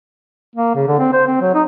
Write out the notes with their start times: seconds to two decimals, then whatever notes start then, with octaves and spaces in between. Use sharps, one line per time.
0.56 A#3
0.75 C#3
0.87 D3
0.99 C4
1.13 C5
1.27 C4
1.41 F#3
1.54 D#4